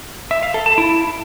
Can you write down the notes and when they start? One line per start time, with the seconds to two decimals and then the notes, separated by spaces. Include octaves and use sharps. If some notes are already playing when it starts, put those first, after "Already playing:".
0.31 E5
0.43 F5
0.54 A4
0.66 A5
0.78 E4